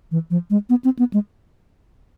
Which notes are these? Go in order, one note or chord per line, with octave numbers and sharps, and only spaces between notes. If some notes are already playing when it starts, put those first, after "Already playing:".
E3
F3
G#3
B3
C4
B3
G#3